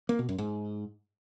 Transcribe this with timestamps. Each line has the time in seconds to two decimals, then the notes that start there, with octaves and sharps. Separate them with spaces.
0.09 A#3
0.19 B2
0.29 F#2
0.38 G#2